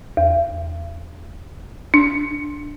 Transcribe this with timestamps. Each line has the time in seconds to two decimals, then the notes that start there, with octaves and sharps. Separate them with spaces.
0.17 E2
1.94 D4